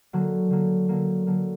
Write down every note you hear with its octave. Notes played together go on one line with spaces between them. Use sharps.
D3 F#3 A#3
D3 F#3 A#3
D3 F#3 A#3
D3 F#3 A#3